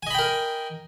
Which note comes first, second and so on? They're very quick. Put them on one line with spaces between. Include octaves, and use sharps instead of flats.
G#5 D#5 B5 G5 A#4